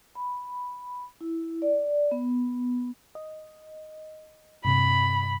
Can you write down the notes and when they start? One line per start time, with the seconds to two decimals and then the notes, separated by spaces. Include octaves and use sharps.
0.15 B5
1.21 E4
1.62 D5
2.11 B3
3.15 D#5
4.65 G2 C3 B5